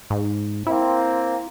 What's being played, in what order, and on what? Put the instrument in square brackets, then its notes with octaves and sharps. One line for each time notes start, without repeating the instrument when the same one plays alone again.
[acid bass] G#2
[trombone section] A#3 C4 [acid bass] E4